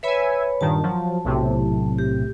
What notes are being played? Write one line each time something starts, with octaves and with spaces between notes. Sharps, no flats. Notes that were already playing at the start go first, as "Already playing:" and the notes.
B4 C#5 E5 G#5 B5
G2 A#2 D#3 A5
F3 F#3
B1 A2 C3
G4